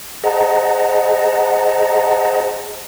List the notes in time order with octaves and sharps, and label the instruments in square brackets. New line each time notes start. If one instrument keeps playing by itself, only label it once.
[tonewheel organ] G#4 C5 D#5 F#5 A5 A#5